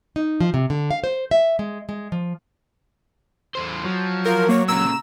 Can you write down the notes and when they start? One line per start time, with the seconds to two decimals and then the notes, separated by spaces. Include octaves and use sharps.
0.16 D#4
0.41 F3
0.54 C3
0.70 D3
0.91 F5
1.04 C5
1.31 E5
1.59 G#3
1.89 G#3
2.12 F3
3.55 E2 C5
3.85 F3 F#3
4.25 F4 A#4
4.49 A#3 C#5
4.68 A#2 C#3 A#5 E6